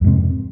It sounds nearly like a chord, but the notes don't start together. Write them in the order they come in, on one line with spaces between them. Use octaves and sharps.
F2 G#2 C3